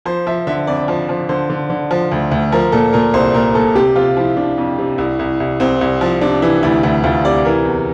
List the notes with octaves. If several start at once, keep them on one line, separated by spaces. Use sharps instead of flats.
F3 C5
F3 E5
D3 E5
F2 D5
F3
F3
D3 C5
D3
D3
F3
D2
D2
F3 A#4
A#2 A4
A#2 A#4
C2 C5
A#2 A#4
A#2 A4
C3 G4
C3 F4
F3 E4
C3 D4
F2
C3
C2 E4
C2
C2
C2 C4
C2
F3
C3 D4
E3 E4
D2 E4
D2 E4
D2 F4
C3 D5
E3 A#4
E2